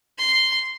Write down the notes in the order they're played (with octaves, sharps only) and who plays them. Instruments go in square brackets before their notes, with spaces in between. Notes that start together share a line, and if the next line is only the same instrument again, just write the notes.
[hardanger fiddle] C6